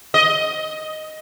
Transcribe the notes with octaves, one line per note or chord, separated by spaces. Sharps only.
D#5